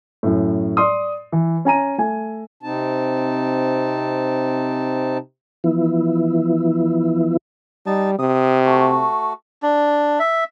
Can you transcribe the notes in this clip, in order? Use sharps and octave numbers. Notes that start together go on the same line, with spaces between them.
F#2 A2
D5 C6 D#6
E3
C#4 G#5 A#5 D#7
A3 G#5
C3 C4 D#4 A5
E3 F3 B3 E4
G3 D#4 A5
C3 D#6
A3 F#4
D4
E5